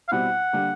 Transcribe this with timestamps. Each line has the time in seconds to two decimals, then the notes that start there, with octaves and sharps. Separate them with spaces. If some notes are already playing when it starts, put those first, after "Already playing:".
0.08 F5
0.12 B2 G3 C4 E4 F#5
0.53 D3 G3 A#3